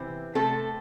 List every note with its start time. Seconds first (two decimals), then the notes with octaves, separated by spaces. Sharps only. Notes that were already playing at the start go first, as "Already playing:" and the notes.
Already playing: C3 E3 C4
0.35 C3 A3 C4 A4